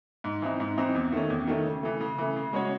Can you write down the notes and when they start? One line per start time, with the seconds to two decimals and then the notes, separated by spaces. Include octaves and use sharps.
0.24 G#2
0.42 E3 C4 D#4
0.60 G#2
0.78 E3 C4 D#4
0.95 E2
1.13 D#3 A3 C#4
1.30 E2
1.47 D#3 A3 C#4
1.66 C#3
1.83 E3 A3
2.01 C#3
2.18 E3 A3
2.36 C#3
2.53 G#3 C#4 F#4 C#5